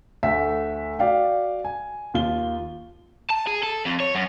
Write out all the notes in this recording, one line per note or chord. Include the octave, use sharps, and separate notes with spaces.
D2 A3 E5 B6
F#4 D5 F5 G5
G#5
D#2 F4 G7
A5
G#4
A4
F2
C#5
F#2